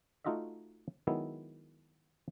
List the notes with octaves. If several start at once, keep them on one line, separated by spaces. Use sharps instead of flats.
A3 D#4 F4 F#4 D#5 E5
D#3 F#3 G#3 B3 E4